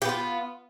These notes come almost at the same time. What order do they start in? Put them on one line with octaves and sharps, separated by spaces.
G4 B3 F4